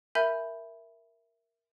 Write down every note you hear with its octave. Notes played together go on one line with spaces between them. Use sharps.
A#4 E5 G#5 B5 G6